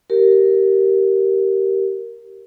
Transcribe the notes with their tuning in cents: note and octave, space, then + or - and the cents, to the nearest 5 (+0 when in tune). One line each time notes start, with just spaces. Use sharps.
G4 -15 A#4 +0